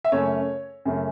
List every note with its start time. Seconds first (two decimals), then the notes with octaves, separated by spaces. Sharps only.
0.04 E5
0.12 F#2 C#3 A3 C#4 C#5
0.85 F#2 C#3 A3 C#4